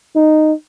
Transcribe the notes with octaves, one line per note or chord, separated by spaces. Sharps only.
D#4